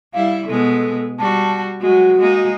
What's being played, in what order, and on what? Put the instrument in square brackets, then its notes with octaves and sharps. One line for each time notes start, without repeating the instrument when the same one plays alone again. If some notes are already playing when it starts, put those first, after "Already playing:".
[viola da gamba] G3 E4 [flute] F5
[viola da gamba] B2 G#3 B3 [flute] A4
[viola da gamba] G3 F#4 [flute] A5
[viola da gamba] F#3 G#3 [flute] F#4
[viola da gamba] G#3 A#3 D#4